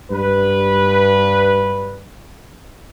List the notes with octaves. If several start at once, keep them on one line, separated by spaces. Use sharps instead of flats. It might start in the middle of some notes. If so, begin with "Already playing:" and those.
G2 B4